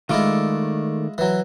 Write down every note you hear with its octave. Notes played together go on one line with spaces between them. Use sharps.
D#3 G#3 A3 E4 F4 D5
E3 F#3